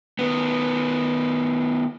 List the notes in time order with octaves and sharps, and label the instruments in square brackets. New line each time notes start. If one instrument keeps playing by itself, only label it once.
[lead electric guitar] D#3 B3